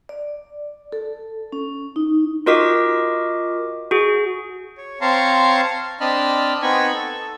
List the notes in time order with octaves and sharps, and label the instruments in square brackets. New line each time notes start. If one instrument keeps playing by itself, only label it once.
[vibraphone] D5
A4
C#4
D#4
[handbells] F4 F#4 A#4 D#5 D6 B6
F#4 G#4
[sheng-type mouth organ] C#5
C4 C#5 F5 A5 A#5 C6
C4 D4 D#5 A5 B5 F6
B3 C4 D#4 G#5 B5 C#6
A4